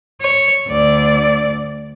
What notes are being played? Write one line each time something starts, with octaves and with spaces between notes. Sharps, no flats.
C#5
D2 D5